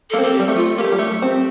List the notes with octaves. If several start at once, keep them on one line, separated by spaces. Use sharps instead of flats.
A4
A#3
C4
A4
G4
G3
A3
F4
A#3 G4
A3
G3
A3
C4